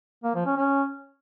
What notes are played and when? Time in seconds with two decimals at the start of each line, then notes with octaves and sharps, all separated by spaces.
0.24 A#3
0.35 F3
0.46 C#4
0.57 C#4